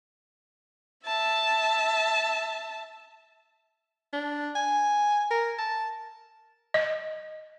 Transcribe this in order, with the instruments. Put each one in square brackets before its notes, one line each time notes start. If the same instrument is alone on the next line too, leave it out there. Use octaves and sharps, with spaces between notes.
[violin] E5 A5
[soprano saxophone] D4
G#5
A#4
A5
[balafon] D#5